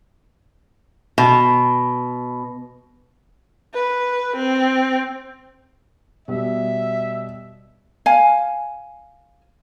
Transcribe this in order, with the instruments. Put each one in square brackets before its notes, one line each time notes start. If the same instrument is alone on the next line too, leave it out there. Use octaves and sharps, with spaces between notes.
[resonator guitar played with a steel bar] B2
[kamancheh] B4
C4
[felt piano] B2 G3 [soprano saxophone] E5
[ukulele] F5 G#5